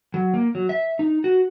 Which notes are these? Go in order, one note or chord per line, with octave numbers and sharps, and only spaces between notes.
F#3
A#3
F#3
E5
D#4
F#4